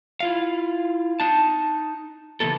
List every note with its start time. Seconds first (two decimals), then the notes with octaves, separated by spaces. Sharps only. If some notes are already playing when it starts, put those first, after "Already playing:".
0.20 E4 F4 F5
1.20 D#4 A5
2.40 C#3 E3 A#3 B3 A4